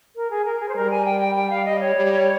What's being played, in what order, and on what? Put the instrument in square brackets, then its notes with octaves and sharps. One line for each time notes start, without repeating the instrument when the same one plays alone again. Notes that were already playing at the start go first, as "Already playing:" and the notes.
[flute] A#4
G#4
A#4
G#4
C5
[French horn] G3 [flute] A#4
[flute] G#5
G5
G5
G5
F5
D#5
C#5
[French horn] G3